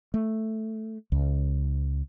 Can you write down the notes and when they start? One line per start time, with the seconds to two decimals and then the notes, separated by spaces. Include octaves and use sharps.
0.14 A3
1.12 C#2